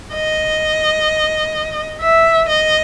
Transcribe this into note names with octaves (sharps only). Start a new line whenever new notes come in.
D#5
E5
D#5